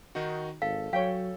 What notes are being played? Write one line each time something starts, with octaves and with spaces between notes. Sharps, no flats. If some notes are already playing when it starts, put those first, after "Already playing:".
D#3 D#4 F#4
G#1 A4 F5
F#3 C#5 F5 G5